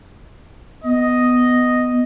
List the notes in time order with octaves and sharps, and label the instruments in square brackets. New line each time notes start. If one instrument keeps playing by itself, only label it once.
[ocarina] B3 [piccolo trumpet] D#5